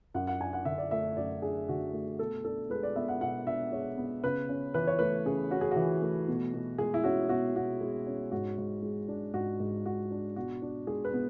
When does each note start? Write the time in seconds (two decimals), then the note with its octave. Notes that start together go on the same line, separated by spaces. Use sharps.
0.14 F#2 F#5
0.27 F#5
0.40 D4 G#5
0.53 F#5
0.65 D3 E5
0.78 D5
0.91 A3 E5
1.17 F#2 D5
1.42 D4 G#4
1.69 D3 F#4
1.93 A3
2.19 B2 A4
2.45 D4 A4
2.70 G#3 B4
2.83 D5
2.96 B3 E5
3.08 F#5
3.21 B2 F#5
3.46 D4 E5
3.72 G#3 C#5
3.98 B3
4.23 C#3 B4
4.49 C#4
4.74 E3 B4
4.87 C#5
4.99 A3 B4
5.26 C#3 G#4
5.51 C#4 F#4
5.61 G#4
5.71 E3 F#4
6.02 A3
6.28 B2
6.54 B2
6.78 G#3 G#4
6.94 E4
7.04 C#4 F#4
7.29 B2 F#4
7.55 B2 F#4
7.81 G#3
8.07 C#4
8.31 G#2 F#4
8.58 G#2
8.82 G#3
9.08 D4
9.34 G#2 F#4
9.60 G#2
9.85 G#3 F#4
10.11 D4
10.36 B2 F#4
10.62 D4
10.87 G#3 G#4
11.05 B4
11.13 B3